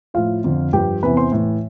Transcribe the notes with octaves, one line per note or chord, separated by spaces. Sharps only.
A2 F3 F4 F5
F2 D3 F3
G2 F3 G4 G5
E2 C3 E3 B4 B5
C5 C6
A2 E3